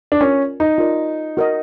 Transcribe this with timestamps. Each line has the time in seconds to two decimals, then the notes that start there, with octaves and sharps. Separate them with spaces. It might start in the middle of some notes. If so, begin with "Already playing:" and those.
0.12 D4
0.21 C#4 F4 A#4 D5
0.60 D#4
0.78 F4 A#4 D5
1.37 F#4 A#4 D#5